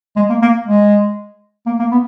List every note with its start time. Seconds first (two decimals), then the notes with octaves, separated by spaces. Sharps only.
0.16 G#3
0.29 A#3
0.42 A#3
0.66 G#3
1.66 A#3
1.79 A#3
1.91 B3